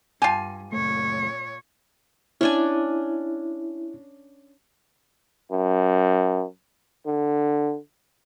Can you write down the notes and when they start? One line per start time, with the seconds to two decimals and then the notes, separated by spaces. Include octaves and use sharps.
0.22 G2 F4 G4 G#5
0.72 F#1 A#2 A3 C#5
2.41 C#4 D4 E4 G#5
5.52 F#2
7.06 D3